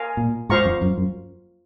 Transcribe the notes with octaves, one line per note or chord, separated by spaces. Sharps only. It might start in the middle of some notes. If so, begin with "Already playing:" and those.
Already playing: A#4 F5 G#5
A#2
G#2 F4 C5 F5 A#5 C#6
F2
F#2
F#2